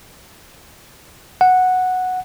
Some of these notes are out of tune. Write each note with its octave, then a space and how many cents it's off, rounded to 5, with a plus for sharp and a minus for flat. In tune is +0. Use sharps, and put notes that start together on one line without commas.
F#5 -5